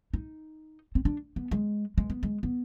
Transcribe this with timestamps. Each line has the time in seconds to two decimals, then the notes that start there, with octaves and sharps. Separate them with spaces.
0.14 D#4
0.95 C4
1.05 D4
1.36 B3
1.51 G#3
1.98 G#3
2.10 B3
2.23 G#3
2.43 B3